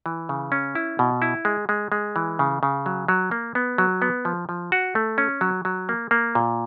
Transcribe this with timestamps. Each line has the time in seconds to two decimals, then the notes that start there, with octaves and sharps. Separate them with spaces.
0.06 E3
0.29 C#3
0.52 C#4
0.75 E4
0.99 B2
1.22 E4
1.45 G#3
1.69 G#3
1.92 G#3
2.16 E3
2.39 C#3
2.63 C#3
2.86 F#3
3.08 F#3
3.31 A#3
3.55 B3
3.78 F#3
4.02 B3
4.25 F3
4.49 F3
4.72 F#4
4.95 A3
5.18 C#4
5.41 F#3
5.65 F#3
5.89 A#3
6.11 A#3
6.35 A#2